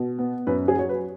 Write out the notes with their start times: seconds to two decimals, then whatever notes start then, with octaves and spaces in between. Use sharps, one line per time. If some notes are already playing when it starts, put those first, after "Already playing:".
Already playing: B2
0.19 B3
0.47 F#2 B4
0.68 G#4
0.75 F#3 C#5
0.89 B4